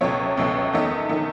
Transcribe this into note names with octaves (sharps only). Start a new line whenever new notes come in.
C#2 B2 F#3 A3 C#5
C#2 B2 F#3 A3
E2 D#3 A3 D#5
D#3 A3